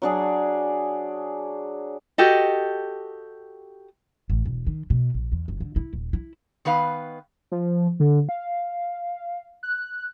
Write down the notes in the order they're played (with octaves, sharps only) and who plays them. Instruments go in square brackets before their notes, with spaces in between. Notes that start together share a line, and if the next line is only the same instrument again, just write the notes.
[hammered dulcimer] F#3 D4 G#4
[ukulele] F#4 G4 A4 D#5
[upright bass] A1
E1
D#3
B2
A#1
E2
F#1
D3
E4
D#1
E4
[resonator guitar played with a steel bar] D#3 B3 B4 F5
[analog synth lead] F3
D3
F5
F#6